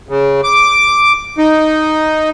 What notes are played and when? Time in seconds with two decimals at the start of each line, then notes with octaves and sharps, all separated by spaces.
0.09 C#3
0.44 D6
1.38 D#4